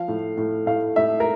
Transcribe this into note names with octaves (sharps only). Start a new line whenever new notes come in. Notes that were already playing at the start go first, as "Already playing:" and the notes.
Already playing: F3 F5
A2
A2
A2 F5
A2 E5
A#4